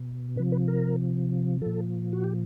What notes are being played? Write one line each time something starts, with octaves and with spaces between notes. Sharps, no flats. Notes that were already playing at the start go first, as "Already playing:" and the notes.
Already playing: B2
C3 F3 B4
B4
A#4
A#2 F3 A4
F#4
G4